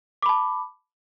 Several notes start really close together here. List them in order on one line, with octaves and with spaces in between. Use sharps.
D6 B5 A5